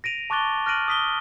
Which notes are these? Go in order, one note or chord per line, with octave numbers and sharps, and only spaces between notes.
A#6 D7 D#7 F7
A5 C#6 D6 F#6 A6 G7
F6 F#6 A#6 D7 D#7 F#7
D#6 B6 G7